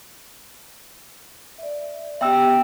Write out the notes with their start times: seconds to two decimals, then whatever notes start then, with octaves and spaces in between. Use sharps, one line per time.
1.58 D5 E5
2.21 B3 G4 E5 G5 E6